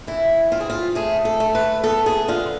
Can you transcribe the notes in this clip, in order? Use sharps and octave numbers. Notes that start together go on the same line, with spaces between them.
E3 E4
C4 F4
G#4
F4
A3 G#4
A4
A3
B4
B3 A4
G#4
D3 F4